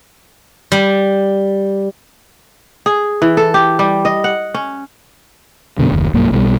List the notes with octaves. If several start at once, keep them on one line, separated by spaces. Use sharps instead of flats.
G3
G#4
E3
A4
G4
G3
D#5
F#5
C#4
F#2 B2 D3
F#1 D#2
B1 G2 F#3 A#3
B1 B2 F3 G3